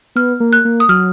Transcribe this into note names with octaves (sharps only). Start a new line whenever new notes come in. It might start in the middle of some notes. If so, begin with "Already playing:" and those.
B3 F6
A#3
F#6
A#3
D#6
F#3 F6